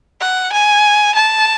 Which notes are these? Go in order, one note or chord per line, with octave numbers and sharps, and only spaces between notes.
F#5
G#5
A5